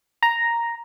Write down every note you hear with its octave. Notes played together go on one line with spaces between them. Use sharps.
A#5